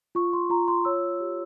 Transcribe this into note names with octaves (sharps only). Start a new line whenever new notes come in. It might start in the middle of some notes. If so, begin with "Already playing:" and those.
F4 C#6
C6
F4 A#5
C6
C#5 E6
G4